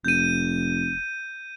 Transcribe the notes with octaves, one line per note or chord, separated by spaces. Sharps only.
F1 G6 D#7